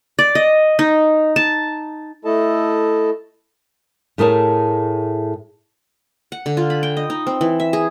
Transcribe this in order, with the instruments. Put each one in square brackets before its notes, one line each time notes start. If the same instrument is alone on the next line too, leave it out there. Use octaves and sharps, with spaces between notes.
[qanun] D5
D#5
D#4
A5
[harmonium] A3 E4 A4 D#5 A5
[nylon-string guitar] A2 A3 G#4 A#4 C#5 A5
[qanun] F#5
D3
F4
B5
G5
D#5
D#4
C4
E3
E5
G#4